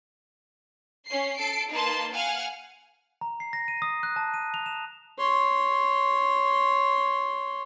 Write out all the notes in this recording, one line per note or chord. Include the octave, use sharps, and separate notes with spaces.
C#4 C7
A4 C7 D7
A#3 D#4 B4 A5 C6
F5 F#5 G#5 F6
A#5
C7
A#6
D#7
D#6
F#6
A5
D#7
F7
E7
C#5 C6